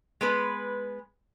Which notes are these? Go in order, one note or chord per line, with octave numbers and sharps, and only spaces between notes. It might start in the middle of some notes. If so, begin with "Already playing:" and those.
G#3 B3 B4